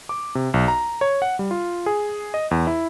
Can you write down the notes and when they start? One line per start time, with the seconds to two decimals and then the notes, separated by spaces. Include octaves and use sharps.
0.09 D6
0.35 C3
0.54 B1
0.68 A#5
1.01 C#5
1.22 F#5
1.39 G3
1.51 F4
1.86 G#4
2.34 D#5
2.51 E2
2.67 E4